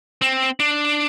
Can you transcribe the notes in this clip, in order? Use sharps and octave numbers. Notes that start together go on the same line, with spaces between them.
C4
D4